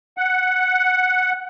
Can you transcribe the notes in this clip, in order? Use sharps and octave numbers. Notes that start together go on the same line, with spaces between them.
F#5